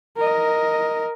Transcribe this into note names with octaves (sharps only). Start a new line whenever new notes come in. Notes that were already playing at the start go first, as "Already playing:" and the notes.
A#4 D#5